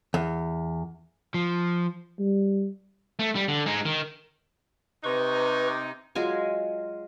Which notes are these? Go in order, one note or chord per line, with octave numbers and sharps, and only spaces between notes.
E2
F3
G3
A3
G3
D3
G#3 D#4
D#3
C3 D#4 B4 C#6
F#3 G#3 F4 G#5